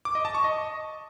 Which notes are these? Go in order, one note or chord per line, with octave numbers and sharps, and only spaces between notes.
D6
D#5
A5
C#6
D#5